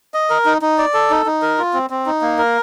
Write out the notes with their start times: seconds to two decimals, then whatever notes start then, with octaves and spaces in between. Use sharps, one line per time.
0.14 D#5
0.30 A#4
0.45 D#4
0.62 D#4
0.78 D5
0.94 A4
1.10 D#4
1.26 D#4
1.42 A#4
1.58 F4
1.73 C4
1.90 C4
2.06 D#4
2.22 A#3
2.38 A#4